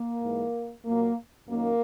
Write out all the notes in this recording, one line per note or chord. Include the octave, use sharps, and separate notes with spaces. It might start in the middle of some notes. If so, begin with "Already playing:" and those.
Already playing: A#3
G#2 E3 G#3
A#2 F#3 A#3
F#2 D#3 F#3 A#3